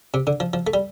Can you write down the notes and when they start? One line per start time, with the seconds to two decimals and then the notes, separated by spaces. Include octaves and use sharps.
0.14 C3
0.27 D3
0.40 F3
0.53 F3
0.67 A3
0.74 G3